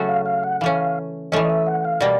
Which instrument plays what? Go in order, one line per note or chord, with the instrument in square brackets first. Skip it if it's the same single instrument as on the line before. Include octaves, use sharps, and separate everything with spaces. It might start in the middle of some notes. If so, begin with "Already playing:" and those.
Already playing: [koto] C#3 F#3 A3 C#4 F#4
[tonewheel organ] F5
F5
F#5
[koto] E3 A3 C#4 [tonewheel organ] F5
[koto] E3 A3 C#4 [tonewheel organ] D#5
[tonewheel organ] D#5
E5
F#5
F5
[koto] B2 G3 A#3 [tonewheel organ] D5